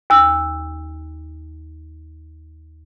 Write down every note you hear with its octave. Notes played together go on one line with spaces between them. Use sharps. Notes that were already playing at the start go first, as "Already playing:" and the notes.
D#2 E6